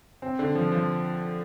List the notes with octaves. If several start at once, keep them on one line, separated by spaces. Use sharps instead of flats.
C4
D3
F3
F3